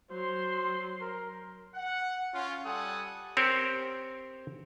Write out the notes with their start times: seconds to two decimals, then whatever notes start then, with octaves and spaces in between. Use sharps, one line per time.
0.11 F#3 C5 C6
1.01 A#4
1.75 F#5
2.34 C#4 F4
2.66 G3 A4 F#5 G#5 D#6
3.37 C4 G4 A#4 C5 C#5